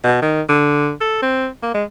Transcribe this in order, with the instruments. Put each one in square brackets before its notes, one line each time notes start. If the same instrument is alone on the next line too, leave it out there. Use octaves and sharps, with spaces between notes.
[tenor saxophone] B2
D#3
D3
A4
C4
A#3
G#3